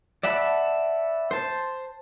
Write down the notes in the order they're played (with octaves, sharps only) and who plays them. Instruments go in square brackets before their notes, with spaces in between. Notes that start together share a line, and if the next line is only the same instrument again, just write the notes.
[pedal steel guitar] D5 E5 F#5 A5 B5
C5 A5